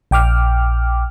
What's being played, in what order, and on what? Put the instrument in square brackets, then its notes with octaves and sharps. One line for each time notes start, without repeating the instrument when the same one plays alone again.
[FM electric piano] A#1 G5 D6 F6